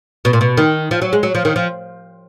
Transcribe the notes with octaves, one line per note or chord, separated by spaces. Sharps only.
B2
A#2
B2
D#3
F3
F#3
G#3
F#3
F3
D#3
F3